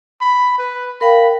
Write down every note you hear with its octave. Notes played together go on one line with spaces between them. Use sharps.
B5
B4
A#4 F5 G5 B5